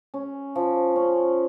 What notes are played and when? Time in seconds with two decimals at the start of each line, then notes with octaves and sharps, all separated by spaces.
0.14 C#4
0.55 F3
0.96 C#4